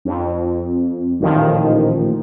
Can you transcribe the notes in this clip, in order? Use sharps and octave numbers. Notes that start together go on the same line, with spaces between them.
F2
A1 A#2 D#3 F3